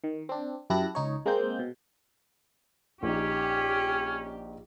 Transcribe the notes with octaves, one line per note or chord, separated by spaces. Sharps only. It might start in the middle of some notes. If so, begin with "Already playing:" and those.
D#3
C4 D4
F#2 E4 G4 A5 F#6 A#6
C#2 D#4 C#5
G#3 A#3 C4 G6
B2
A#1 C#4 D#4 G4